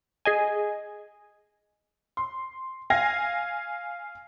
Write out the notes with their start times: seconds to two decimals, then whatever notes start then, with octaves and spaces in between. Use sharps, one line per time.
0.25 G#4 D#5 G#5
2.17 C6
2.90 F5 G#5 G#6 A#6